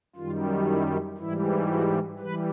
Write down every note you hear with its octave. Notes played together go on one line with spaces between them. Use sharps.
F#2 D#3 G3 F4
E4
G#2 E3 G3 E4
F#4
E3 G3 B4